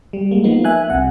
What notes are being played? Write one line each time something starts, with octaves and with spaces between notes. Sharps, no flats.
G3
G#3 A#3
F3 A#3 B3 D#4
E5 G#5 F#6
C2 C3 F#5